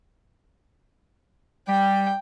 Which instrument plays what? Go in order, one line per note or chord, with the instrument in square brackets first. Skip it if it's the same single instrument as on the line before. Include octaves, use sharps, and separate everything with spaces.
[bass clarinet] G3 [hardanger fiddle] G5